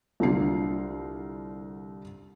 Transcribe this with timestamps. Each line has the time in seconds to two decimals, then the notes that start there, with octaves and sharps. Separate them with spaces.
0.20 C2 D3 F4 C7